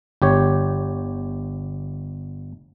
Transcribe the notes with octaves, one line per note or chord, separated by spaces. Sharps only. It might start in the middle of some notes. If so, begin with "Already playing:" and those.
G1 G4 C#5